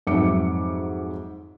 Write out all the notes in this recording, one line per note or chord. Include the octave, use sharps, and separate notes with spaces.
F2 G#2 F#3 E5 D6 C#7